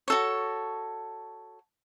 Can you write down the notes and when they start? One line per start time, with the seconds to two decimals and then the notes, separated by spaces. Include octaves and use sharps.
0.08 F#4 A4 C#5